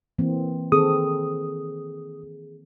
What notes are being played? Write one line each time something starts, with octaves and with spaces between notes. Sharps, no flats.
E3 A#3 C4
D#3 C4 G#4 A4 D#6